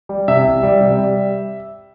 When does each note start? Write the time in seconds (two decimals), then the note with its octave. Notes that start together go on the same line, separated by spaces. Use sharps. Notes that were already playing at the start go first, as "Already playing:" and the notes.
0.09 G3
0.28 C3 E5
0.45 C2
0.63 G3
0.81 C3
0.98 G3